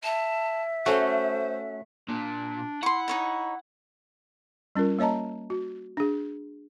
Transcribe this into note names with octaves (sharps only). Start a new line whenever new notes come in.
E5 A5
A3 C#4 F#4 C5
A#2 D4
E4 F#5 C6 C#6
D#4 C#5 D#5
G3 C#4 F4 A#4
A#3 C#5 D#5 A5 A#5
F#4
D4 G#4